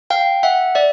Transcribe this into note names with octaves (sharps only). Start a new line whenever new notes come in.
F5 G5
E5 F#5
D5 E5